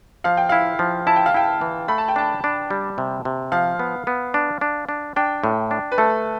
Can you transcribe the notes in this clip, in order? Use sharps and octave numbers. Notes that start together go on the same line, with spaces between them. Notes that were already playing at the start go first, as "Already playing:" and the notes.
F3 F5
G5
E4 F5
F3
E4 A5
G5
F5
E4 G5
E3
A3 B5
A5
G5
D4 A5
D4
G3
C3
C3
F3 F5
B3
B3
D4
D4
D4
D4 G5
A2
D4
B4
A3 A4